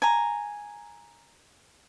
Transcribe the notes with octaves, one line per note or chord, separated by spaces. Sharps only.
G#5 A#5